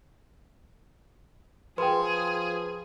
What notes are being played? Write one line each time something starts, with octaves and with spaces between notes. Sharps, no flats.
F3 G#4 B4 G5 C6